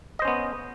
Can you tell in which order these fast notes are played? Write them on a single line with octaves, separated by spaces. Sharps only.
D#5 C5 C#4 B3